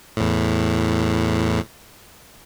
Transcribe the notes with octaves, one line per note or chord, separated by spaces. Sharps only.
E2 A2